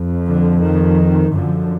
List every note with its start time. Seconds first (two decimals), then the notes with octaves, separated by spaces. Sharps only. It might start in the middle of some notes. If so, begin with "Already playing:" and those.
Already playing: F2
0.26 D3
0.62 D#3
1.34 F#2 D3 F3